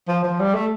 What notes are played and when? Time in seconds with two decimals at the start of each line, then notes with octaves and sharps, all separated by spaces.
0.08 F3
0.24 F3
0.40 G3
0.54 A3